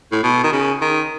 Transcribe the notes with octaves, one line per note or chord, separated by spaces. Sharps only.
A2
B2
D#3
C#3
D#3